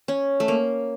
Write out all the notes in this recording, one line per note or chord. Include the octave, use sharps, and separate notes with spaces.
C#4
A3
A#3